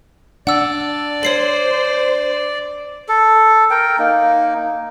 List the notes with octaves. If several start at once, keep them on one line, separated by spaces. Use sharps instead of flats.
D4 D5 F#5 E6
C5 C#5 C7 F#7
A4
A#4 G5
A#3 D#4